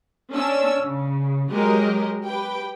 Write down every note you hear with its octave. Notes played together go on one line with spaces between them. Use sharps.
C#4 D4 E6
C#3
F#3 G#3 G4 A#4 D#5
G4 B4 G5